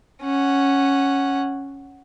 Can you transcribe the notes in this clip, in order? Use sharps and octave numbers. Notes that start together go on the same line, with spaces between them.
C#4 F#5